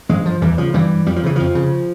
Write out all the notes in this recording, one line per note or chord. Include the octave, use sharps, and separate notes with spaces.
G2 F3 G#3
F3
E2 E3 G3
C#3 F3
G2 E3 G3
F2 G3
F3
C#3 E3
F2 F3
C#3